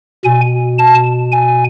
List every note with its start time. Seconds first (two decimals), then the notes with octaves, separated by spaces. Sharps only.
0.25 B2 G#5
0.79 A5
1.32 G#5